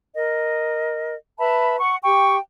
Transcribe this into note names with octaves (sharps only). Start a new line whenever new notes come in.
A#4 D#5
B4 E5 A5 B5
F#5 C#6
G4 G5 C#6